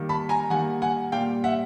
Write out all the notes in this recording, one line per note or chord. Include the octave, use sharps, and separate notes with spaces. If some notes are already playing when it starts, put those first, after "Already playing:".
Already playing: D#3 G3 A#3
A5 B5
G#5 A#5
D#3 G3 A#3 F#5 G#5
F#5 G#5
A#2 G3 A#3 F5 G5
E5 F#5